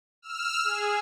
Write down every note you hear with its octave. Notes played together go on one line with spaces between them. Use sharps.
E6 F6
G#4